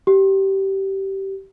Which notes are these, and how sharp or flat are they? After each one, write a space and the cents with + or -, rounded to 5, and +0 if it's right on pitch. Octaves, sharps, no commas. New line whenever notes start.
G4 -20